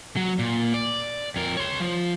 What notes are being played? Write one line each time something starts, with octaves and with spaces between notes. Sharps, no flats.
F#3
A#2
D5
F2 A#4
C#5 C6
F3